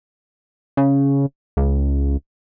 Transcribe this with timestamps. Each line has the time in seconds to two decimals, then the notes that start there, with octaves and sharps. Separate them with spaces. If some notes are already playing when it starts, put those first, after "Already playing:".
0.77 C#3
1.57 C#2